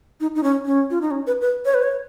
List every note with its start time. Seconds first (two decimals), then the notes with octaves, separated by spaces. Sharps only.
0.20 D#4
0.35 D#4
0.43 C#4
0.66 C#4
0.90 F4
1.01 D#4
1.11 C#4
1.27 B4
1.41 B4
1.65 C#5
1.74 B4
1.83 C#5